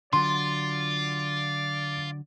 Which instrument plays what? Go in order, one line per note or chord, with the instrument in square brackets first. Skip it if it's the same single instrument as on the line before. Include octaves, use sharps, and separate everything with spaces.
[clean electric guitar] D3 F#3 [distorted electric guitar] F4 [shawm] D5 [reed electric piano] C6